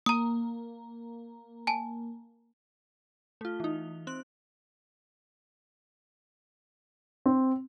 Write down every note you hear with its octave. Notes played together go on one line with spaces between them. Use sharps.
A#3 A#5 D#6
G#5 A5
A3 F4
E3 D#4
C4 F#6
C4